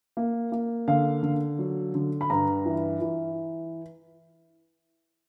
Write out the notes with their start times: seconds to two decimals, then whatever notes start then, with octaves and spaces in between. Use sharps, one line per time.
0.17 A#3
0.52 A#3
0.88 D3 F5
1.23 D3
1.59 F#3
1.95 D3
2.21 B5
2.30 G2 A#5
2.65 E3
3.01 E3